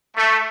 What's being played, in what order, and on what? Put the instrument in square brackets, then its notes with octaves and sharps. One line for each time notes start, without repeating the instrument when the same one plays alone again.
[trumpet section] A3